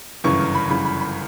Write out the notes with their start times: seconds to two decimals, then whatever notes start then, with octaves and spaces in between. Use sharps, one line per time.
0.24 G1 F#2 C#3 E3 C#6
0.40 C#6
0.55 B5
0.69 G1 F#2 C#3 E3 B5
0.85 B5
1.00 B5